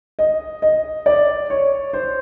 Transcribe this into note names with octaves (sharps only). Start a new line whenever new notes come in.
D#5
D#5
D5
C#5
C5